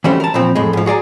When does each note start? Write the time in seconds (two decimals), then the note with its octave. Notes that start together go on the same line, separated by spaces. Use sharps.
0.04 E3 F#3 G3 A3 C#4 C5
0.20 A#4 A5
0.34 A#2 E3 F3 C4
0.55 F2 A2 G#3
0.73 G#2 F3
0.86 F#4 G#4 D5 A#5